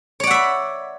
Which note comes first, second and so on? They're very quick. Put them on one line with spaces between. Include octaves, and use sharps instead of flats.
C#5 D5 F#5 E5 B5